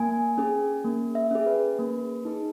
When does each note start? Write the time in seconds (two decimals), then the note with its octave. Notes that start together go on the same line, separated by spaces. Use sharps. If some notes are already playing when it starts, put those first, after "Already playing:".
Already playing: A#3 G#5
0.38 C#4 G#4
0.85 A#3
1.15 E5
1.31 C#4 G#4
1.46 B4
1.79 A#3
2.25 D#4 G#4